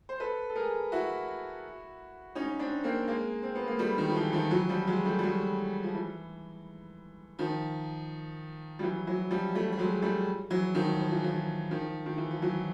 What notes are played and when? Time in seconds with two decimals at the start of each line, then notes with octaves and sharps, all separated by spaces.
0.09 C5
0.20 A4 B4
0.50 A4
0.55 G#4 A#4
0.92 E4 F#4
2.35 C#4 D#4
2.59 C4 D4
2.84 A#3 C4
3.08 G#3 A#3
3.43 C4
3.55 B3
3.67 A#3
3.79 G3 A3
3.98 D#3
4.09 F3
4.16 E3
4.33 D#3 F3
4.51 E3 F#3
4.69 F3 G3
4.87 F#3 G#3
5.05 G3 A3
5.19 G3
5.23 F#3 G#3
5.83 F3
5.95 E3
7.39 D#3 F3
8.79 G3
8.82 E3 F#3
9.07 E3 F#3
9.31 F3 G3
9.55 G3 A3
9.73 A3
9.78 F#3 G#3
10.02 G3 A3
10.50 E3 F#3
10.75 D#3 F3
10.99 F3
11.12 E3
11.24 D#3 F3
11.71 D#3 F3
12.06 D#3
12.18 E3
12.31 F3
12.42 E3 F#3